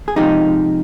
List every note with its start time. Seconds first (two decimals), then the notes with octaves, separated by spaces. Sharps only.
0.08 G#4
0.16 C3 F3 G#3 D#4 G4